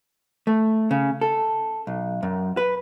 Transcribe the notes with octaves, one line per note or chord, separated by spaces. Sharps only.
A3
C#3
A4
B1
F#2
B4